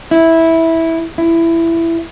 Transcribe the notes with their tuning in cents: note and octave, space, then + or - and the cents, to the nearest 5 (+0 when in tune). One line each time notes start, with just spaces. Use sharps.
E4 -10
E4 +15